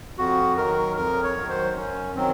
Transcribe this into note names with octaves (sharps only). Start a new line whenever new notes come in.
F2 F#4
D#3 F#3 A#4
F2 A#4
C#5
D#3 F#3
C5
F#2 C#4
D#3 F#3 C4